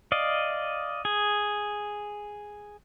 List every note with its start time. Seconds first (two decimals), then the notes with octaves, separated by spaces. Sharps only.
0.12 D5 D#5 F5
1.05 G#4